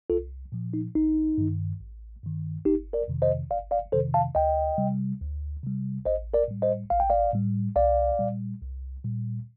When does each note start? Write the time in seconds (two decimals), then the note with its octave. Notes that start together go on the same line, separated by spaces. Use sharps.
0.10 C2 F4 A4
0.52 A#2 F3
0.74 D#4
0.95 A1 D#4
1.38 G2 D#3
1.81 A1
2.23 G2 D#3
2.65 G1 D#4 G4
2.93 A#4 D5
3.08 F2 C3 D#3
3.22 C5 D#5
3.50 G1 D5 F5
3.71 D5 F5
3.92 F2 C3 D#3 A4 C5
4.14 F5 A5
4.35 D2 D#5 G5
4.78 C3 G3
5.21 D2
5.63 C3 G3
6.06 A1 C5 D#5
6.34 A#4 D5
6.48 A2 G3
6.62 C5 D#5
6.90 A1 F5
7.00 G5
7.10 D5 F5
7.33 A2 G3
7.76 C2 D5 F5
8.19 A#2 G3
8.61 C2
9.04 A#2 G3